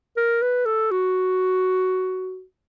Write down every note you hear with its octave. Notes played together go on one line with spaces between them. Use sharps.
A#4
B4
A4
F#4